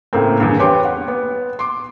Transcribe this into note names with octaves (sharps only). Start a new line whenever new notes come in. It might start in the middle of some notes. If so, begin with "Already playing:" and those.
A2 C#3 A#3 C4
E2 G2
G4 B4 C#5 G5 C6 D6
F#5
B3
C6 D6